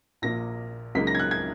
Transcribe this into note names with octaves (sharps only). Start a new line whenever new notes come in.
A#1 A#2 A#3 A#6
C#2 C#3 F#3 A#3 D#4 B6
A#6
G#6
F#6
G#6